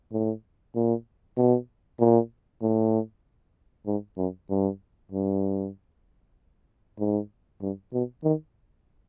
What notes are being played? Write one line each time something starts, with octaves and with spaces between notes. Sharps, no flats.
A2
A#2
B2
A#2
A2
G#2
F#2
G2
G2
G#2
G2
B2
D#3